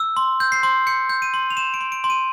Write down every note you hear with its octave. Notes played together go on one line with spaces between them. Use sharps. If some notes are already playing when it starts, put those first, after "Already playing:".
Already playing: E6
C6
G6
C7
C6
G6 C#7
G6
D#7
C6
F7
C6 E7
D7
C6
D7
C6
D#7